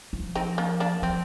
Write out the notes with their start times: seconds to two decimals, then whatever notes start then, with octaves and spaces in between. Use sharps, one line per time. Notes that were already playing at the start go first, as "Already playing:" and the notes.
0.13 F3
0.35 C4 D#4
0.58 A#3 D4
0.80 A#3 D4
1.02 F3 C4